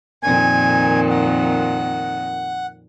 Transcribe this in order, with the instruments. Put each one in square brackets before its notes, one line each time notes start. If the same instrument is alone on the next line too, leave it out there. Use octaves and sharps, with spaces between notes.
[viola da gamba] F2 A#2 D#3 [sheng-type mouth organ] G#5
[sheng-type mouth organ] F#5